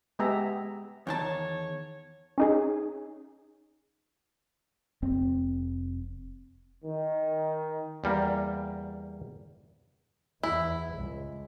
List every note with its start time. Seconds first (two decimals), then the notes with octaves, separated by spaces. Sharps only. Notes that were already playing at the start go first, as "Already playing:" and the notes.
0.19 G#3 B3 G4 G#4 E5 A#5
1.07 E2 D#3 C#5 A5
2.38 C#4 D#4 G#4
5.02 F1 C4
6.85 D#3
8.04 E2 G3 A#3
10.43 E2 E4
10.94 C#2